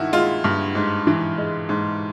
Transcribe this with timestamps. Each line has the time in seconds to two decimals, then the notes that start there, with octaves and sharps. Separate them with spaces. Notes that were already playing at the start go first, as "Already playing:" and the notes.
Already playing: G2 D#3 E4 F#4
0.12 G#3 F4
0.44 G2
0.75 G#2
1.07 E3
1.38 G#3
1.69 G#2